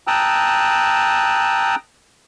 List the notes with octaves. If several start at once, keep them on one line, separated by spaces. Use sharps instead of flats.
G5 A5 A#5 D#6 E6 F#6